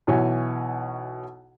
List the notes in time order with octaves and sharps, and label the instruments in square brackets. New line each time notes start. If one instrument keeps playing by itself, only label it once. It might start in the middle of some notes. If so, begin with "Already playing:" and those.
[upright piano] B1 B2 E3 C#5 G#5